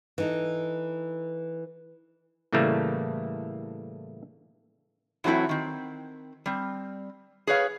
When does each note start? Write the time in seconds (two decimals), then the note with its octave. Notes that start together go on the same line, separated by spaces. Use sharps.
0.18 E3 D#4 A4
2.53 A2 C#3 E3 G3 A3 A#3
5.24 E3 F#3 A3 C4 E4
5.49 D#3 C4
6.46 G3 C4
7.47 G#4 B4 C#5 F5